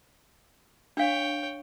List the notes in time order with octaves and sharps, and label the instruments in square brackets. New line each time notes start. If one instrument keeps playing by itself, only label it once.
[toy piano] D4 F5 [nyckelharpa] C#5 G5